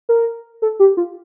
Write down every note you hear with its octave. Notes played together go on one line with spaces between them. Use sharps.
A#4
A4
G4
F4